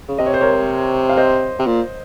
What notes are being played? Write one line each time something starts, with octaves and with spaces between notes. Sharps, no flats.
C#3
C3 D#5
C#5
C5
A#4 C#5
F5
C5 D#5
C3
A#2